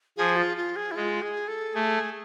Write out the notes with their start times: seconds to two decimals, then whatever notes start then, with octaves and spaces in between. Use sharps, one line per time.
0.17 F3 G#4
0.36 F4
0.57 F4
0.76 G#4
0.91 E4
0.96 G#3 F4
1.22 G#4
1.48 A4
1.74 A3 G#4